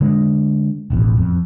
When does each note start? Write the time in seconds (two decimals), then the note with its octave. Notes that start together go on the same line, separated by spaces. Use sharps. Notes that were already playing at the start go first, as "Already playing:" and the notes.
0.01 D3 G#3
0.90 E1 A1 E2
1.17 F2